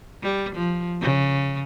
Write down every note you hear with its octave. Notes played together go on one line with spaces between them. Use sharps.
G3
F3
C#3